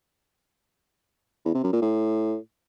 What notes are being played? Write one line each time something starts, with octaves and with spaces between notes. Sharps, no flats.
E2
C3
F#2
A#2
A2